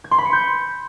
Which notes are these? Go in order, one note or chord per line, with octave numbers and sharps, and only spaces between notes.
G#6
C6
B5
C#7
G6